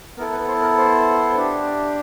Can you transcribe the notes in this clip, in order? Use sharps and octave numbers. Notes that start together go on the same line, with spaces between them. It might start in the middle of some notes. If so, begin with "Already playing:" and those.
B3 E4 A4 A#4
B4
C5
A#4
C5
D4 G4